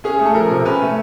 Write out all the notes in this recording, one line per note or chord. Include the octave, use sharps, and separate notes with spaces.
C#4 G#4
A3
A4
F3 A#4
C3
C#4 B4
A3